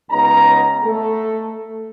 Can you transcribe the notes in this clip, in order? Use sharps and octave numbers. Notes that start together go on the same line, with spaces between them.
C#2 C#3 B3 D#4 A#5
A3 A4